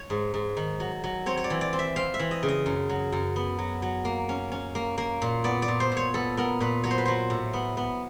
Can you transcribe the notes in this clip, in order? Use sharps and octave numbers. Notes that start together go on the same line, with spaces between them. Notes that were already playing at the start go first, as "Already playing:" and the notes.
Already playing: C#5
G#2
G#2
D#3
F#3
F#3
C4 C#5
C#5
D5
E3
D5
C4
E5
C4 F5
E5
E3
D#5
C#3
D#5
F#2
F#3
F#2
B3
F#3
F#3
A#3
C#4
C#4
A#3
A#3
A#2
B3 D5
D5
A#2
C5
A#2
C#5
B3 A4
B3 A#4
A#2 B4
F#3 C#5
C5
B4
F#3 C5
A2
B3
B3